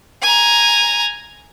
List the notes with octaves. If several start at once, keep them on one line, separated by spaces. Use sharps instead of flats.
G#5 A#5